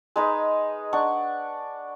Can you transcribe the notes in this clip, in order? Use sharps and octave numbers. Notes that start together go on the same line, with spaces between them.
G#3 D#4 B4
D4 F#5 C#6